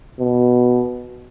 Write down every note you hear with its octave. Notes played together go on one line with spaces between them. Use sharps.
B2